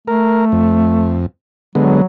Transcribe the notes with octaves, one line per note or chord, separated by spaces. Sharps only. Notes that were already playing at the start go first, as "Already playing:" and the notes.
A3 A#4
F2
D3 F#3 G#3 B3